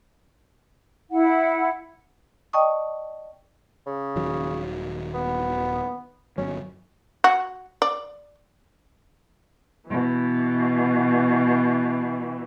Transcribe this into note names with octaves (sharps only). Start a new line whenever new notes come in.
E4 F#5
D5 D#5 G5 A5 C#6 D#6
C#3
D#1 D#3 F#3
B3
G1 F#3 C#4
F#4
D5
B2 E3